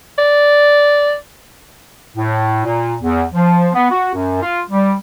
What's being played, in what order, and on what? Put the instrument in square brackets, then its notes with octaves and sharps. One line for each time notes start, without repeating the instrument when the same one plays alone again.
[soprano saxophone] D5
[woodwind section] A2
A#2
E2
F3
B3
F#4
F#2
F4
G3